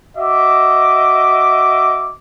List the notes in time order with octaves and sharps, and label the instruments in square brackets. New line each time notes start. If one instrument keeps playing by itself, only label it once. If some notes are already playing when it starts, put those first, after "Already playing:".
[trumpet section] F#4 D#5 E5 D6